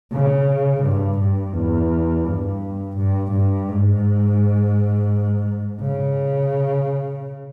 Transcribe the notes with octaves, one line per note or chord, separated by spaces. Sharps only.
C#3
G2
G2
E2
G2
G2
G2
G#2
C#3